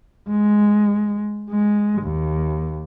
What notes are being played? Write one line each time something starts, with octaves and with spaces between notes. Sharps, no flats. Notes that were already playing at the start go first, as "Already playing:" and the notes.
G#3
G#3
D#2